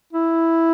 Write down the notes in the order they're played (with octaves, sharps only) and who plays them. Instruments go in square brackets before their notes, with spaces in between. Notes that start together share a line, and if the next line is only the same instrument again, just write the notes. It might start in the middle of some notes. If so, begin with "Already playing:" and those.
[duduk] E4